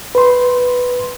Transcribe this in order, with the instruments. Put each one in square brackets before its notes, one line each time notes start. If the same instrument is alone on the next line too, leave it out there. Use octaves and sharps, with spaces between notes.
[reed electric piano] B4 C6